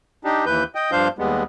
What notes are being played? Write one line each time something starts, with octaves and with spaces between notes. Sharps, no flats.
D4 D#4 G4
D#2 E3 B4 G6
D#5 G5
G2 F3 D4 C5 F5 G6
D#2 G3 G#3 B3